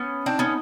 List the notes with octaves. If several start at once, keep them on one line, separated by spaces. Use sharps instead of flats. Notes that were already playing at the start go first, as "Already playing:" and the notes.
Already playing: B3 C#4
C4 D4 D#4
B3 C#4